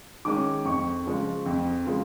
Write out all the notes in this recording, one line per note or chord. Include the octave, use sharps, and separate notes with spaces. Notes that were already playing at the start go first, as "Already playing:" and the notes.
D#3 G#3 C#4 D6
F2 C#6
C#3 F3 G#3
F2
C#3 F3 G#3